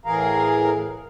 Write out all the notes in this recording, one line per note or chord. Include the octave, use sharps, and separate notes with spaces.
A2 E3 G#4 A#4 F5 A#5